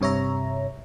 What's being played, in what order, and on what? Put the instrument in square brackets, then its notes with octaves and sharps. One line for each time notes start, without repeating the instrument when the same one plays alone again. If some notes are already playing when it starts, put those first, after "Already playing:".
[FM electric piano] G2 C3 C#5 E5 A#5